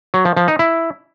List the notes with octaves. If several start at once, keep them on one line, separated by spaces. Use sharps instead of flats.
F#3
F3
F3
D#4
E4